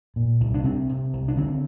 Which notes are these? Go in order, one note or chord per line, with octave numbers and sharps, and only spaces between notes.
A#2
C2
D4
C3 C4
C3
C2
D4
D3 C4